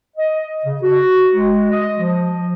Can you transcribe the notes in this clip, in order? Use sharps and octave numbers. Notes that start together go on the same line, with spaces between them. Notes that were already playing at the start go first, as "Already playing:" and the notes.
D#5
C#3
F#4
G#3
D#5
F3